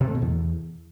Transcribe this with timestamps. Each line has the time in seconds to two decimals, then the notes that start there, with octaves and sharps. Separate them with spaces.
0.01 C3
0.08 A3
0.15 B2
0.22 E2